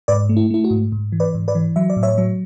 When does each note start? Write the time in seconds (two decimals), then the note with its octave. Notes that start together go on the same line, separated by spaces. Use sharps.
0.08 G#2 B4 D5
0.29 A3
0.37 E4
0.50 A3 E4
0.64 F#4
0.71 G#2
0.92 G#2
1.12 E3
1.20 B4 D5
1.34 G#2
1.48 B4 D5
1.55 E3
1.76 F#3 E5
1.90 D5
1.97 A2
2.03 C#5 E5
2.18 F#3